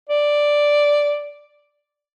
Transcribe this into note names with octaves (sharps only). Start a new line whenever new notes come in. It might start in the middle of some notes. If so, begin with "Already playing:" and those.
D5